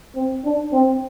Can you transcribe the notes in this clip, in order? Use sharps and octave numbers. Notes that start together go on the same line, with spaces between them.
C4
D4
C4